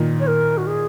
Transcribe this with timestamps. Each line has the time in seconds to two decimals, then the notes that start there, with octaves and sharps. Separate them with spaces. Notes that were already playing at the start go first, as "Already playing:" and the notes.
Already playing: A#2 D#3
0.20 C#5
0.27 A#4
0.57 F#4
0.66 G#4